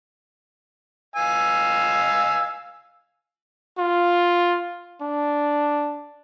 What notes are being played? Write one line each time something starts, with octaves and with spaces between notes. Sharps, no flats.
F5 G#5 E6
F4
D4